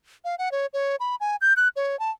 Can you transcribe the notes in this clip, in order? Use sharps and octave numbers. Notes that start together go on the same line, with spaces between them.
F5
F#5
C#5
C#5
B5
G#5
G6
F#6
C#5
A5